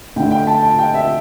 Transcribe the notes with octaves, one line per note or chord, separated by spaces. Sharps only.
D2 D3 G5
G5
A5
A5
G5
E5